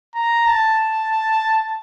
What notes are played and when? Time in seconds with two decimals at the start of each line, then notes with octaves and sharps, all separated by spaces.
0.15 A#5
0.47 A5